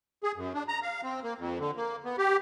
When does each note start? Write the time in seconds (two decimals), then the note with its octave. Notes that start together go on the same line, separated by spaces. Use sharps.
0.23 G#4
0.36 F#2
0.54 D4
0.68 A#5
0.82 F5
1.03 C4
1.23 A#3
1.39 F2
1.59 D3
1.77 A#3
2.05 B3
2.18 G4